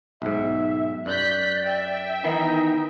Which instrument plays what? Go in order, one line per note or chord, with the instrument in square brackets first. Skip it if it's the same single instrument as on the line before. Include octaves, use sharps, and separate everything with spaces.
[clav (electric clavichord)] B1 G#2 [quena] E5
[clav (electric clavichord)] F#2 [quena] D5 [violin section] F#6 G6 B6
[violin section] E5 G5
[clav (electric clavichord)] D#3 E3 B3 [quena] D#4